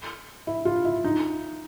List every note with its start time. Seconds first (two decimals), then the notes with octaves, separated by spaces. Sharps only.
0.47 E4
0.65 F4
0.85 E4
1.04 D#4